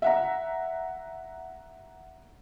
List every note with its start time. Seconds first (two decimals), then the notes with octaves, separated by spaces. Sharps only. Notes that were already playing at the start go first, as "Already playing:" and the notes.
0.02 E5 F#5 A#5